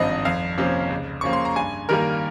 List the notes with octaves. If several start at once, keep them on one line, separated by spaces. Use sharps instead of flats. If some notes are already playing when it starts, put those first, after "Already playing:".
Already playing: G#1 G2 F3 C4 D#5
F2 F5
C3 F3 A#3 C#4
C#2
C#3 F3 A#3 C#6
C6
A#5
G2 G#5
D#3 G3 A#3 A#4